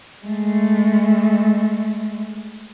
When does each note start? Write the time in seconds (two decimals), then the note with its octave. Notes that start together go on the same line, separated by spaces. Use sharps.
0.25 G#3 A3